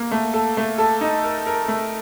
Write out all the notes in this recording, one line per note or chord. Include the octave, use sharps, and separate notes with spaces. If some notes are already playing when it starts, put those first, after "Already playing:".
Already playing: A#3
A3
A4
A3
A4
D#4
A#4
A#4
A3